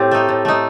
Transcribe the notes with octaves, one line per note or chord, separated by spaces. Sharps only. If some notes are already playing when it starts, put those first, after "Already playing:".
Already playing: A2 C4 G4
A3 D#4
A2
A3 D#4